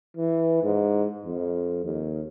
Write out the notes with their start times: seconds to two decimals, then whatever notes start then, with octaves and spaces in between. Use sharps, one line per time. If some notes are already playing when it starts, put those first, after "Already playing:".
0.17 E3
0.63 G#2
1.26 F2
1.84 D#2